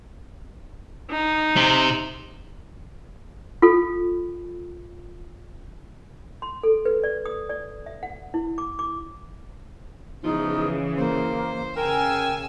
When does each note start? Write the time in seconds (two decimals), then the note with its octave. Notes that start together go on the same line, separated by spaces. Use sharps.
1.10 D#4
1.56 C3
3.62 F4 A4
6.42 C6
6.63 A4
6.85 B4
7.03 D5
7.25 D#6
7.50 D5
7.86 E5
8.03 F#5
8.34 E4
8.58 D6
8.79 D6
10.23 E2 C#3 E3 F3 D#4
10.98 A#3 C5
11.77 C#3 A#4 G5 G#5 E6